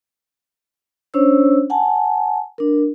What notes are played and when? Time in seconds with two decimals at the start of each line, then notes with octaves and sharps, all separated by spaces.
1.14 C#4 D4 C5 C#5 E6
1.70 F#5 G#5 A5
2.58 D4 A#4